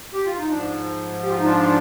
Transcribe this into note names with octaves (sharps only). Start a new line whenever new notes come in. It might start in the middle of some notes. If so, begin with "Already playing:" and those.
G4
F4
D#4
G#2 F3 D4
G4
F4
D#4
D4 F4